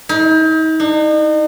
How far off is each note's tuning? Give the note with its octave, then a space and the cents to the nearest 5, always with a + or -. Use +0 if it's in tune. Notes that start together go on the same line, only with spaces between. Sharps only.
D#4 +40
D#4 -40